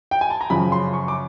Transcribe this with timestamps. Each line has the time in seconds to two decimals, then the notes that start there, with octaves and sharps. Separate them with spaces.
0.11 G5
0.21 G#5
0.30 A5
0.41 A#5
0.50 F#2 C#3 F3 B5
0.72 C6
0.93 C#6
1.08 D6